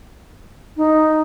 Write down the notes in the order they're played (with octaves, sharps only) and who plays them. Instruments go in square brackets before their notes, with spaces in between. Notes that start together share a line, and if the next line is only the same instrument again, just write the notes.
[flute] D#4